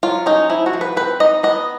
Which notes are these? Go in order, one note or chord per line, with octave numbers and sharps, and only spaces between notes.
F#3 F4
C#4 D#4
F3 E4
F#4
F3
B4
C4 B4
D#4 D#5
B3 D#5